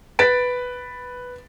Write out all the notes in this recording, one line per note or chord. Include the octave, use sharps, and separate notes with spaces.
B4 A6 B6 D7